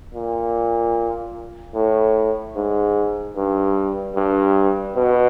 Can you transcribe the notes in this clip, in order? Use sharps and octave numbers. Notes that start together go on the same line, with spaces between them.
A#2
A2
G#2
G2
G2
B2